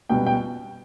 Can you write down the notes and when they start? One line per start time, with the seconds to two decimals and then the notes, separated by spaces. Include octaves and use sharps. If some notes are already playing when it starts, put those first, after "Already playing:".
0.09 C#2 B2 G3 B3 G5
0.26 G5